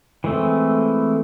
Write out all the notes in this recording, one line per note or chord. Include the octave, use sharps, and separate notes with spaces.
E3 G#3 A3 C4